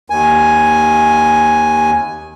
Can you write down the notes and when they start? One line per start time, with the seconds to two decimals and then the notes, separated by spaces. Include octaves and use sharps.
0.10 D#2 G#5